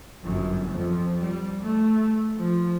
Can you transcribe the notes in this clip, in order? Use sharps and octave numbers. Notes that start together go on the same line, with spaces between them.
G1 F#2
F2 F3
G3
A3
F3